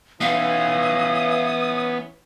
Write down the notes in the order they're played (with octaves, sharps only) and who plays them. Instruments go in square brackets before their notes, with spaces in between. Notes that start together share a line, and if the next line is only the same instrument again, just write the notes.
[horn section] E3 C#4 [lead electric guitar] B3 C#5 [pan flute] F5 [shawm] D#6